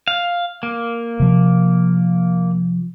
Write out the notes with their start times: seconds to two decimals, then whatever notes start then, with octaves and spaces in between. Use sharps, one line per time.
0.08 F5
0.63 A#3
1.20 C3 F3